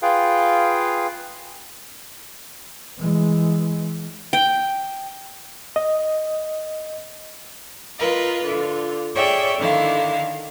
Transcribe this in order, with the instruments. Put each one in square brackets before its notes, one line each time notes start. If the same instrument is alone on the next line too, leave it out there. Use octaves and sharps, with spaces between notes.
[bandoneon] F4 G#4 B4 F5 G5
[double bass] E3 G#3
[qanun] G5
[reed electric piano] D#5
[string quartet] F4 A#4 B4 D#5
D3 F4
G#4 C#5 D5 E5 G5
D3 D#3 E4 F5